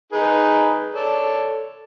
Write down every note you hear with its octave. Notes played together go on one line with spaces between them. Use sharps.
D#4 G#4 B4
A4 C#5 D5